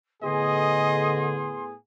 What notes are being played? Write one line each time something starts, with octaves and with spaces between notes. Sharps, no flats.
A2 D3 B3 G#4 D#5 C6